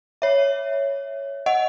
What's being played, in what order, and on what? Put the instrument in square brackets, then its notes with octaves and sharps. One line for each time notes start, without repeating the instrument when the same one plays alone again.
[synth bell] C#5 E5
D#5 F#5